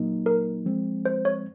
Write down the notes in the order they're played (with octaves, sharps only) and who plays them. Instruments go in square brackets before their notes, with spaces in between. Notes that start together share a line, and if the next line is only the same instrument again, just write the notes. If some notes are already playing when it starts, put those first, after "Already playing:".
Already playing: [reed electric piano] A#2 F#3 A#3 D#4
[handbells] A#4
[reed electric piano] F3 G#3 C4
[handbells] C5
C#5